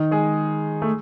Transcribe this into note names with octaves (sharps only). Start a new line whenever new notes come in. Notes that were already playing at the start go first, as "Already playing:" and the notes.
Already playing: D#3 D#4
G#3 G#4
A3